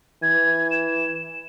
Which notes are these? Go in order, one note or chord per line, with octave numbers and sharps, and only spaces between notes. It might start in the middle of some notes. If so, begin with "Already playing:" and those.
E3 G#6
E7